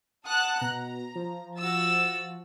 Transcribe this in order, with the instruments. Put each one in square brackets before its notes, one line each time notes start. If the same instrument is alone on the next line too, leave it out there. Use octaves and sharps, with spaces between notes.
[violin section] F#5 A5 F#6 [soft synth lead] D#6
[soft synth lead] B2 [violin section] A#5
[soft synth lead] F3
[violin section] F#4 E6 A6